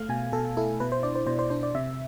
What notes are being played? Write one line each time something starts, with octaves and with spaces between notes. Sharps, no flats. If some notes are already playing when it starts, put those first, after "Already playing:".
Already playing: A3 F5
B2 G#5
B2 A4
E4 A4
B2 B4
C5
D4 D5
C5
B2 C5
C5
D4 C5
D5
C3 E5